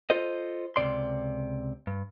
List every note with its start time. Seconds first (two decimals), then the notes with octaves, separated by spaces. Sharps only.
0.10 F4 A4 C5 D#5
0.76 C#2 G2 C3 D5 C6
1.87 G2